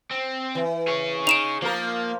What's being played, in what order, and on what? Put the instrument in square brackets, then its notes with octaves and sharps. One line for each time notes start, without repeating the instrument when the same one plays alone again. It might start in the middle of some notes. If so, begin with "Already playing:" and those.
[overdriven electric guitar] C4
[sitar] E3
[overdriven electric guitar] G#4 C#5
[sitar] D#4 [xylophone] D7 E7 F7
[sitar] F3 A#4 [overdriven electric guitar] A#3